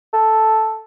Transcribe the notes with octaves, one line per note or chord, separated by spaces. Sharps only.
A4